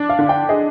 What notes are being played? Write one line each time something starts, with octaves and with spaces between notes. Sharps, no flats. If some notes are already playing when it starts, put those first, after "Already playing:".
Already playing: D4
F5
D3
G5
G#4 D#5